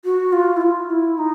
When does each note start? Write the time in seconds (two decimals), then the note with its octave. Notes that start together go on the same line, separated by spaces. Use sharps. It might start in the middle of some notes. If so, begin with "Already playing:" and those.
0.05 F#4
0.33 F4
0.57 E4
0.61 F4
0.90 E4
1.18 D#4